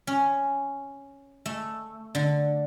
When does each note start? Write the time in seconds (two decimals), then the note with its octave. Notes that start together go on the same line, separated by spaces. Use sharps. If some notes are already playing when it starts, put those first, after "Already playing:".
0.07 C#4
1.46 A3
2.15 D3